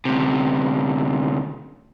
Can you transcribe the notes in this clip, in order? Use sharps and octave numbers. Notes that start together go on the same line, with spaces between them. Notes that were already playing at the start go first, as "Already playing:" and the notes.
D2 C3